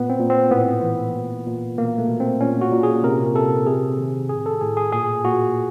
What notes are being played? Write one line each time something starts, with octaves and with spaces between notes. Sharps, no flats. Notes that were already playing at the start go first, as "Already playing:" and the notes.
Already playing: A#2 B3
C4
A#2
C4
A2 B3
E3
A#2
A#2
B2 A#3
A3
B2
C4
A#2 C#4
F#4
A#2
G#4
C3 A#4
C3 A4
C3 G#4
D#3
A2 G#4
A4
A2 G#4
G#4
A#2 G#4
A#2 F#4